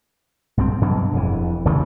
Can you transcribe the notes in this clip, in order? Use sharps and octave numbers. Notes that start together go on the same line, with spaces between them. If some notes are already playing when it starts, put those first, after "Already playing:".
B1 G2 B2 C4
G2 B2 F#3 D4
E1 F2 E3
D#2 C#3 E3 A3